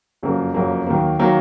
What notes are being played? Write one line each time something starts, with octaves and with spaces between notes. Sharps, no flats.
F#1 F2 C#3 F#3 A#3
F#1 F2 C#3 F#3 A#3
D#2 D#3 F#3 A#3
D#3 F#3 A#3